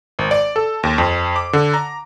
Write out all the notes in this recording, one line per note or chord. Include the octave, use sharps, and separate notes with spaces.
G#1
D5
A4
D#2
F2
D6
D3
A#5